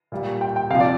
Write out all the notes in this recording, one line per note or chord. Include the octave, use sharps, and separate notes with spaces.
A#2 G3
G5
G5
C3 F3 F5
D5